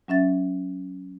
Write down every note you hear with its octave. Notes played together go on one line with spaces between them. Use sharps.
F#3 C#4 E5 A6